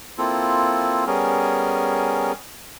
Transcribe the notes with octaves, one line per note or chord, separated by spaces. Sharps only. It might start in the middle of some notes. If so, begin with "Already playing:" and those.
A#3 C4 E4 F4 A4
G3 B3 C#4 G#4 A#4